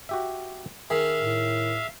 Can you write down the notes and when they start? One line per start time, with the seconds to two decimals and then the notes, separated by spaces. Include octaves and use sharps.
0.09 F#4 G4 E5
0.90 D#3 G#4 E5 F5
1.19 A2